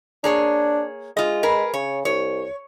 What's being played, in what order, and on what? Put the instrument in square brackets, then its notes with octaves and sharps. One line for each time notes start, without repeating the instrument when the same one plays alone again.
[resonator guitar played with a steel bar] A#3 G#4 C#5 [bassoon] D4
[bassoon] G#3 [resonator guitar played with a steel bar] F4 D#5
[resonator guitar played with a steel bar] G#4 A#4 B4
[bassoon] C#3 [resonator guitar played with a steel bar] C#5
[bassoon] C2 [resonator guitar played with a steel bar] C#5